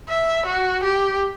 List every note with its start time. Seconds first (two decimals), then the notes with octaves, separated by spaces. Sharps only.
0.09 E5
0.46 F#4
0.84 G4